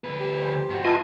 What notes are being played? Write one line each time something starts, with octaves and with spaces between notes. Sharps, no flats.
D2 B4
G4
C5
G2 F#4
F4 B4 D#5 E5 G#5 A5